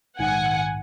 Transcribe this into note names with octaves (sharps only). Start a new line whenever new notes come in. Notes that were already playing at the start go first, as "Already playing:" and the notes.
A#1 G#2 D#3 F#5 G#5